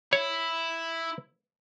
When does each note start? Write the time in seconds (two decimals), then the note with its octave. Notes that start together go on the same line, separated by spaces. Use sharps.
0.13 E4 C#5